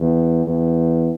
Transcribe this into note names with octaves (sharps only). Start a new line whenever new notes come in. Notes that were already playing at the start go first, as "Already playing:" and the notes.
Already playing: E2
E2